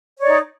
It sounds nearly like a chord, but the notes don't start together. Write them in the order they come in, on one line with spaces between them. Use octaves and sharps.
C#5 D5 D#4